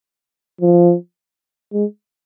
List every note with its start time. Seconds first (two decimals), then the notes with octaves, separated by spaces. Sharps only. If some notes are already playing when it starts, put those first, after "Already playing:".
0.61 F3
1.73 G#3